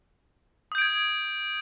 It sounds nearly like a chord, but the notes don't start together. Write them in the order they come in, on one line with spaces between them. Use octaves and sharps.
D#6 G6 D7 G#6